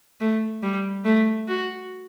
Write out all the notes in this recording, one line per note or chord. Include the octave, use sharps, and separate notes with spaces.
A3
G3
A3
F#4